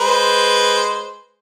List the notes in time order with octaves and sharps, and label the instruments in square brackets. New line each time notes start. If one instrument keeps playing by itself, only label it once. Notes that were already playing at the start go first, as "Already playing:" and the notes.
[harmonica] G#3 B4 C5